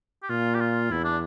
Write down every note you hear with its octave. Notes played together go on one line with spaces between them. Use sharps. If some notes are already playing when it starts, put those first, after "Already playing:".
G4
A#2 F4
G4
F4
E2 E4
D4